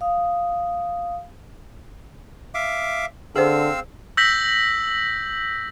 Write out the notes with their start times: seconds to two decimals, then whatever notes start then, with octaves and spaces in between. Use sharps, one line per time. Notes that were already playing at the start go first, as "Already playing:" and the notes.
0.01 F5 D#6
2.54 E5 F5 D6
3.36 D3 C4 G#4 C5 F5 E6
4.17 E6 G6 A#6 B6 F#7